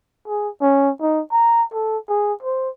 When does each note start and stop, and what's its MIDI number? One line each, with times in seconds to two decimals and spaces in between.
0.28 0.49 68
0.61 0.90 61
1.01 1.21 63
1.32 1.64 82
1.73 1.98 69
2.09 2.33 68
2.42 2.69 72